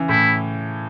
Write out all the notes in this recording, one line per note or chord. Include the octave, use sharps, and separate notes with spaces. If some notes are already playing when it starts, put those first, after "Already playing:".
Already playing: C#3 E3
A2 E4